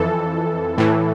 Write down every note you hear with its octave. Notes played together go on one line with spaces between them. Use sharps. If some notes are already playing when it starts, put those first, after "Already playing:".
Already playing: F2 E3 A4
A2 E3